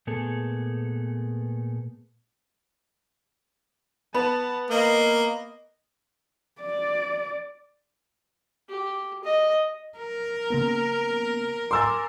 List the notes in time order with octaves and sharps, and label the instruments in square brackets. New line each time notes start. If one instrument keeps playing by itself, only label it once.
[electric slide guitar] A#2 A3 B3 G#4 A4
[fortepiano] B3 [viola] A5
[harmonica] A#3 [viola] D#5
[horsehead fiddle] D5
[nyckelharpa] G4
D#5
[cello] A#4
[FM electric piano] C#3 A#3 B3
[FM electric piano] G#5 A#5 D6 [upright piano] C6 E6 A6